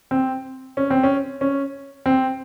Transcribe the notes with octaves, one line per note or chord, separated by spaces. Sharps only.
C4
C#4
C4
C#4
C#4
C4